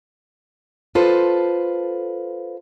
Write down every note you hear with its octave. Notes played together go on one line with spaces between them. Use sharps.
F4 A4 B4 C5